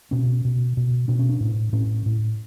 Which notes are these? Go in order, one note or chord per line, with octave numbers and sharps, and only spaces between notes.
B2 C#4
B2
B2
B2 D4
C#4
D4
A2
A2 C#4
A2